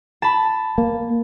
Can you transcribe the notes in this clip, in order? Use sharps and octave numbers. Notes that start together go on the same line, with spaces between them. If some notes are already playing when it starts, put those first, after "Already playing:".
A5 B5
A#3